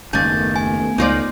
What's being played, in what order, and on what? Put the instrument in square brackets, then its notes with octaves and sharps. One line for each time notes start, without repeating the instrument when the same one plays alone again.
[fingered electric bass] F#1 C#4 [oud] D#2 G#4 [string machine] A3 B3 [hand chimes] G6 A6
[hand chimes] G#5
[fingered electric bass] C#2 [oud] D#4 F4 D5